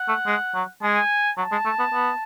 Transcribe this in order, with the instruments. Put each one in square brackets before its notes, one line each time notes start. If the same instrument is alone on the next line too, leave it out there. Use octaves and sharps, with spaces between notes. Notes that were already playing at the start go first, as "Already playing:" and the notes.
Already playing: [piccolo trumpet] F#5
[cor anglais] A3
G#3
F#3
[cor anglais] G#3 [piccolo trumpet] G#5
[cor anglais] F#3 [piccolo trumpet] A5
[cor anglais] G#3
A3
B3
B3